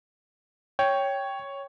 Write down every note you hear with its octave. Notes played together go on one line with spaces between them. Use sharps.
C#5 G5